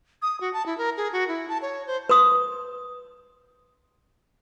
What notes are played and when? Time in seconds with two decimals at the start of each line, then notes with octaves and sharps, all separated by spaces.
0.22 D#6
0.41 F#4
0.53 A5
0.66 E4
0.78 A#4
0.97 G#4
1.12 F#4
1.28 E4
1.49 A5
1.62 C#5
1.87 C5
2.09 B4 C6 D#6